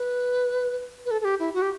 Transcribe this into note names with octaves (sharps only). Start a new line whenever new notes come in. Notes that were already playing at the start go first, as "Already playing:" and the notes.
Already playing: B4
B4
A4
A4
G4
E4
F#4
G4